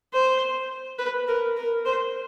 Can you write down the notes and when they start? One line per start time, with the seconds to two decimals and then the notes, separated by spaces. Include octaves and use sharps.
0.13 C5
0.99 B4
1.28 A#4
1.57 A#4
1.86 C5